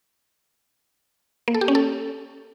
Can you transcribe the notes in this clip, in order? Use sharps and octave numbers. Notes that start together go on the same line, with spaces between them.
A#3
A4
G4
C#4
A4